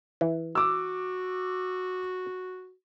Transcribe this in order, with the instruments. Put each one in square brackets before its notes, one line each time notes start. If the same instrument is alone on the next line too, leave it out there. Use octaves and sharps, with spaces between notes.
[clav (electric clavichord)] E3
[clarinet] F#4 [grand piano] D6 E6